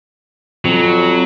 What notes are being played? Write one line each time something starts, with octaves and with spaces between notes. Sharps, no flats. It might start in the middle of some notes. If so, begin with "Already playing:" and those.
F2 F#3